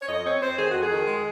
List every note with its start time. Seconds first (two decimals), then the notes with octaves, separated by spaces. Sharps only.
0.02 C#5
0.09 F2 D#5
0.24 C4 C#5
0.41 C4 C5
0.58 D#3 G#4
0.69 F#4
0.75 F2
0.82 G#4
0.91 D#3
1.07 G#3